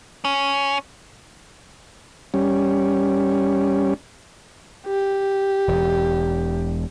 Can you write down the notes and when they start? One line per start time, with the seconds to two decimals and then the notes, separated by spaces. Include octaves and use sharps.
0.25 C#4
2.34 G3 C#4
4.87 G4
5.68 E1 E2